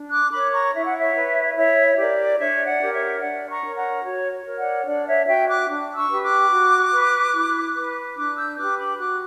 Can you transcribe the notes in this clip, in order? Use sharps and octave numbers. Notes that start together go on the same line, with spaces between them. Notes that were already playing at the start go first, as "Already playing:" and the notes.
Already playing: D4
D6 F#6
A#4 C#5 B5 D6
A#5 C#6
E4 E5
F#5
C#5 E5
B4
E4 C#5 E5
G4 A#4 D5
D4 C#5 E5
D5 F#5
G4 A#4
C#5 E5
D4 D5 F#5
A#5 C#6
A#4 C#5
F#5 A#5
F#4 C#5
A#4 C#5
D5 F#5
D4 D5 F#5
C#5 E5
F#4 C#5 E5 G5
D6 F#6
D4
C#6 E6
G4 B4
D6 F#6
F#4
B4
E4
B4
D4 D6 F#6
E6 G6
G4 B4 D6 F#6
B5 D6
F#4 D6 F#6